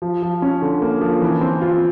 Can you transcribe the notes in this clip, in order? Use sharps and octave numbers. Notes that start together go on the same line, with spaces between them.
F3
F3
C#4
D3
A#3
F3
E3
C4
F4